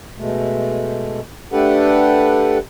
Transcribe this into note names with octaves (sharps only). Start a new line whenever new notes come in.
B2 G#3 A3
A3 D4 G4 A4 B4 F#5